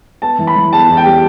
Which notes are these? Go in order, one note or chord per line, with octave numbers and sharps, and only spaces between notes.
B3 A5
E3
B5
E3
E2 A5
E2
G5
G3